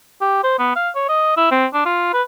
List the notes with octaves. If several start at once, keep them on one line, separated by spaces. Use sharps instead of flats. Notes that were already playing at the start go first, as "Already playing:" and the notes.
G4
C5
B3
F5
C#5
D#5
E4
C4
D4
F4
B4